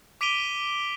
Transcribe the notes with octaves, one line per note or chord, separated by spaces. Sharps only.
D6 B6 D7 D#7 F7 G7